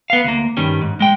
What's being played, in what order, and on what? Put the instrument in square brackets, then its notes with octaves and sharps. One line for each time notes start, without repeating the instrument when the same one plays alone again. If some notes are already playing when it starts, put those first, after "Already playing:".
[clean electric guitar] B3 F5
D2 A#3
G2 D#3 G3 C#4
G#2
G#3 G5